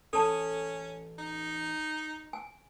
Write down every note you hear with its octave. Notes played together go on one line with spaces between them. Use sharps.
A1 C#4 A4 A5
D#4
G#5